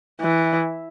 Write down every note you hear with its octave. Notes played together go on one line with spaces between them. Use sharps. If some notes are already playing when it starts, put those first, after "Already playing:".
E3